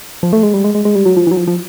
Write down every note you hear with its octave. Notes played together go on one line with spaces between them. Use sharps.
F3
A3
G#3
G3
G#3
G#3
G#3
G3
F#3
F3
E3
F#3
F3
F3